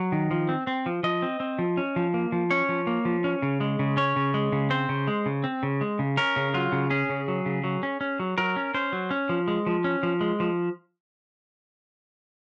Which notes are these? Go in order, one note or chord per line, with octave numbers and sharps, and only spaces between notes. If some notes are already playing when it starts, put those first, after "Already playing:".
Already playing: F#3
D#3
F3
C4
C4
F3
F3 D#5
C4
C4
F3
C#4
F3
A#3
F3
C#4 C#5
F3
A#3
F3
C#4
C#3
G#3
C#3
C#4 C#5
C#3
G#3
C#3
C4 C5
C#3
G#3
C#3
C4
C#3
G#3
C#3
C#4 A#4
C#3
F#3 F4
C#3
C#4 G#4
C#3
F#3
C#3
F#3
C#4
C#4
F#3
F#3 A#4
C#4
C#4 C5
F#3
C#4
F3
G#3
F3
C#4
F3
G#3
F3